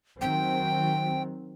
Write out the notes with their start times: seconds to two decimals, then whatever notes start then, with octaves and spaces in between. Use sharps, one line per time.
0.21 D#3 F#3 C4 G5